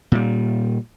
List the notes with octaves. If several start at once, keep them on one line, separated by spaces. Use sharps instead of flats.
A#2 G3